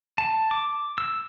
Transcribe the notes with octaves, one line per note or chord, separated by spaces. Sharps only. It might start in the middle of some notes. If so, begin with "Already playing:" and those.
A5
D6
E6